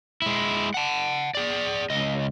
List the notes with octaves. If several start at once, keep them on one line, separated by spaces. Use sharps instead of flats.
G#3 E4
F#5 A5
G#4 D5
C#2 D#5